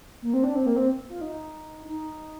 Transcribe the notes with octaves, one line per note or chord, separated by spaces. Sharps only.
A#3
C4
D4
C4
A#3
C4
F4
D#4
D#4